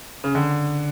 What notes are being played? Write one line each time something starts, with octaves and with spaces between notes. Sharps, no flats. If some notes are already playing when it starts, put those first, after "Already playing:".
C#3
D3